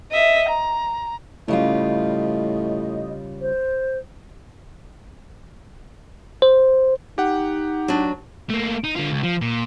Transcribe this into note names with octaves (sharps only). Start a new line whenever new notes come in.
D#5 E5
A#5
A2 C#3 G3 F4 D#5
C5
C5
D#4 G4 F#5
F#3 D4
A3 A#3
D#4
D3 F4
C#2
F3
A#2